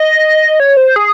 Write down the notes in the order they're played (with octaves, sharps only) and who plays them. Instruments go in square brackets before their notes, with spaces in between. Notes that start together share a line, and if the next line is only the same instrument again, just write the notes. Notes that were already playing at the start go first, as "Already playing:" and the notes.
Already playing: [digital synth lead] D#5
C#5
C5
G#4